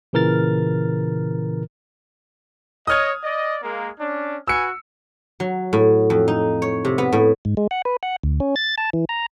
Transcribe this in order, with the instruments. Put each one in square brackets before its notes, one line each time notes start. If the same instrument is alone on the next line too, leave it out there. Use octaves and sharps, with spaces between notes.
[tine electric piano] A#2 C#3 E3 A#4 F6 A6
[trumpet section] C#5 D#5 [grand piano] D#6 F6 G#6
[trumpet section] D5 D#5
G#3 A#3
C#4 D4
[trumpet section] F#4 B4 G#5 [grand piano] E6 C#7
[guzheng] F#3
A2
F2
D#4
C#5
C3
B3
A2
[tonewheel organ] G#2
G#3
F#5
B4
F#5
D2
C#4
A6
A5
E3
A#5